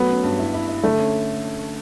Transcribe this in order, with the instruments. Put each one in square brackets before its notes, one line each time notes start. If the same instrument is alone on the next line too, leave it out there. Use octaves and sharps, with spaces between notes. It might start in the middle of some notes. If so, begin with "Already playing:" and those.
Already playing: [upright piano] F#3 A3 [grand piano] B3
[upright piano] C#4
G2
E4
E4
E4
[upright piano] D3 [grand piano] A3
[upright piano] C#4